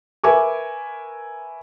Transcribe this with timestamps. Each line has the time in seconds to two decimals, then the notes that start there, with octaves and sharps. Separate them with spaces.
0.24 A#4 B4 E5 G#5 C#6 D6